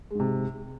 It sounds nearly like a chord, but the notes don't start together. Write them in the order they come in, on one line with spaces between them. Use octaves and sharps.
G#3 G#2 C3